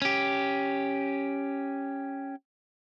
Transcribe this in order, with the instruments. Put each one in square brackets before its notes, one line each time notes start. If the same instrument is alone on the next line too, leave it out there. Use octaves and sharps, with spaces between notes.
[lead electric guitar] C#4 G4